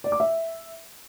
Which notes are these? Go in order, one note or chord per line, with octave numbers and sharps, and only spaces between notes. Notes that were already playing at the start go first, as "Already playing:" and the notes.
D5
D6
E5